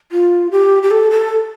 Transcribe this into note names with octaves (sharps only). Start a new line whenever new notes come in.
F4
G4
G4
A4
A4